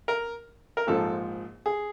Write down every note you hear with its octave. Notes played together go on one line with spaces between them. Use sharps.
A#4
A#4
A#1 G#2 F3 A4
G#4